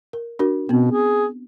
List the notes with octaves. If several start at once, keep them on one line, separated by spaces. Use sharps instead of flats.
A#4
D4 F#4 A#4
B2 B3 C4
G#4